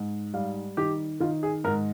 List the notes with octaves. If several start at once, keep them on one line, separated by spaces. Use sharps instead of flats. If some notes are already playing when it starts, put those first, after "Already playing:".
Already playing: G#2
G3 F5
D#3 G4
D#3 F4
G#4
G#2 A#4